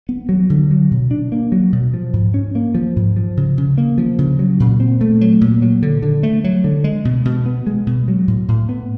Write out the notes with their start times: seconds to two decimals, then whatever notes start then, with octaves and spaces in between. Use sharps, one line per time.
0.09 B3
0.29 F#3
0.50 D3
0.71 F#3
0.91 B2
1.11 D4
1.32 A#3
1.52 F#3
1.72 B2
1.94 F3
2.13 G#2
2.34 C#4
2.55 A#3
2.75 F3
2.96 G#2
3.16 F3
3.37 C#3
3.58 C#3
3.78 A#3
3.98 F3
4.18 C#3
4.39 F#3
4.60 A#2
4.80 C4
5.01 A3
5.21 F#3
5.41 A#2
5.62 F#3
5.82 D3
6.02 D3
6.23 A3
6.44 F#3
6.64 D3
6.84 G#3
7.05 B2
7.25 B2
7.46 B3
7.67 G#3
7.87 B2
8.08 F#3
8.28 A2
8.48 A2
8.69 B3